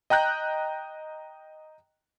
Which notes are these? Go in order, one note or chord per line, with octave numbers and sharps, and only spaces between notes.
D#5 G5 A#5 F#6 G6 A#6